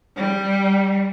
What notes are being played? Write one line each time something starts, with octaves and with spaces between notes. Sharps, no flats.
G3